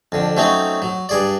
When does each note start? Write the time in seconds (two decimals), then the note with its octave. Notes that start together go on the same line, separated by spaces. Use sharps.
0.12 F2 D3
0.37 F#3 A3 C4 C#4 D#4
0.82 F#3
1.09 G2 G#4 D5